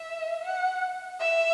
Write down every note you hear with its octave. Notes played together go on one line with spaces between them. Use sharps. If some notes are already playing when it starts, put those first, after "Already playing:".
Already playing: E5
F#5
E5